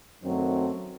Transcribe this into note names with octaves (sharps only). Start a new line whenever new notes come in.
F#2 D#3 F#3 A3 C4